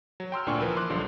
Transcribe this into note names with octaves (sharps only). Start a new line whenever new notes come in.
F#3
G5 C6 E6 F6
D2 A#2 D4 G#5 C#6
E3 F3 A#4 B4
C6 D6 F#6
B1 D3 F3 G3